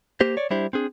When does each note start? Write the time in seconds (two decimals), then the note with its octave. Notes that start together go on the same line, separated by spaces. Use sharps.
0.21 A#3 G4 C5
0.37 C#5 D5
0.50 G3 D4 E4 G4 C5
0.73 C4 D4 G#4